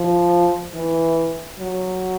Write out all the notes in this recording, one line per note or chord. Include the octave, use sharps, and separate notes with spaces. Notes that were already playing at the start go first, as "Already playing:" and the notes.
Already playing: F3
E3
F#3